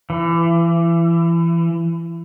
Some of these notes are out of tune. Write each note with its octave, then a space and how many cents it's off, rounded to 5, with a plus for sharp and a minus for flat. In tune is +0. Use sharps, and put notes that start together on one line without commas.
E3 +25